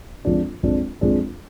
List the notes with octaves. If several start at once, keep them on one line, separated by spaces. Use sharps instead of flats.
F2 F3 G#3 D4
F2 F3 G#3 D4
F2 F3 G#3 D4